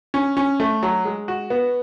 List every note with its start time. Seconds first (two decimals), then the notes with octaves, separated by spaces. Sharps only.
0.14 C#4
0.37 C#4
0.60 A3
0.83 F#3
1.05 G#3
1.28 F#4
1.50 B3